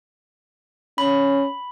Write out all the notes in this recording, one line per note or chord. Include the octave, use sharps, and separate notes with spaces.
C#4 B5